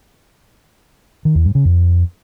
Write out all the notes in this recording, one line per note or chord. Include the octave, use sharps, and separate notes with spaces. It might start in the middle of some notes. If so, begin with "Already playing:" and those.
D#3
E2
G2
C#3
F2